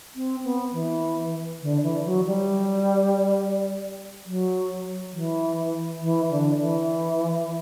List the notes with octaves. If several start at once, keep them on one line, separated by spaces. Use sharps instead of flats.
C4
B3
E3
D3
E3
F#3
G3
F#3
E3
E3
D3
E3